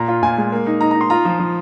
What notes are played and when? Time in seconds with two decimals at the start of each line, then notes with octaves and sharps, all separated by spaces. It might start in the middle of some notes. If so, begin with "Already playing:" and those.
Already playing: A#2 A#5
0.08 F4
0.22 A#2 G#5
0.37 G#3
0.52 A#3
0.66 D#4
0.81 D#4 A#5
0.91 A#5
0.95 D#4
1.01 C6
1.10 F4 A#5
1.25 F3
1.39 F3